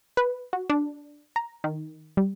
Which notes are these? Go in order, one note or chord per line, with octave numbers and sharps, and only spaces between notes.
B4
F#4
D4
A#5
D#3
G3